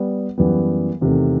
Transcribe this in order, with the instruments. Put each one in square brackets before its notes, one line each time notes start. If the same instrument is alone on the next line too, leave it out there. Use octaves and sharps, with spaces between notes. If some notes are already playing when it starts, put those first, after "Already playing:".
Already playing: [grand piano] G3 B3
F#2 E3 G3 B3
E2 C3 D#3 A3